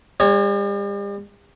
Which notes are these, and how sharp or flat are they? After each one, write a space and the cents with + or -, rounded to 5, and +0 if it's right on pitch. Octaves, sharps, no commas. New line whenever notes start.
G3 +45 C#5 +0